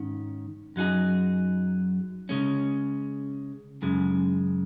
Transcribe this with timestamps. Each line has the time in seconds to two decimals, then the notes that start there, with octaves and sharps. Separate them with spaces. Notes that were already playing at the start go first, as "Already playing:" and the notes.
Already playing: G#2 D#3 C#4
0.76 F#2 F#3 D#4 G#4
2.29 C#3 G#3 C#4
3.82 F#2 C#3 G#3